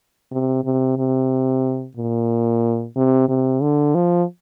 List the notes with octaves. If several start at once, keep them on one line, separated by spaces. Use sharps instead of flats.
C3
C3
C3
A#2
C3
C3
D3
F3